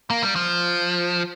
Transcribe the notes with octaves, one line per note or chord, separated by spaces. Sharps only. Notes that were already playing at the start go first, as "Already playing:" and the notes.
A#3
G3
F3